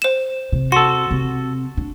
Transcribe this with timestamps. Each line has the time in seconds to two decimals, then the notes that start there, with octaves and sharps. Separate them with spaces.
0.02 C5 E7
0.52 C3
0.72 F#4 A4 C6
1.10 C3 C4
1.77 D4